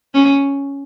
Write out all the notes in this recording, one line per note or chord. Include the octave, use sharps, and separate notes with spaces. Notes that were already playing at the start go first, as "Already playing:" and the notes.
C#4